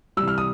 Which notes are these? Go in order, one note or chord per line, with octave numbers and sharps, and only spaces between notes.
C3 E3 G3 E6
F6
D#6